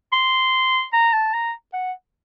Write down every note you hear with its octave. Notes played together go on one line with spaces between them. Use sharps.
C6
A#5
A5
A#5
F#5